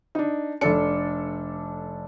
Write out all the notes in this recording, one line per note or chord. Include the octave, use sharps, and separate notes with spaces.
D4 D#4
F1 D4 A4 C#7